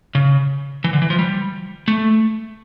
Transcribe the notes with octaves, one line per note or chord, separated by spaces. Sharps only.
C#3
E3
D3
E3
F3
G3
A3